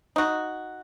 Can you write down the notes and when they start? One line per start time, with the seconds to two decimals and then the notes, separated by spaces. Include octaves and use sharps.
0.16 D#4 F#4